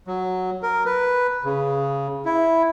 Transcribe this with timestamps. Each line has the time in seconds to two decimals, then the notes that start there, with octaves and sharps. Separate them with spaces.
0.07 F#3
0.63 A#4
0.85 B4
1.44 C#3
2.25 E4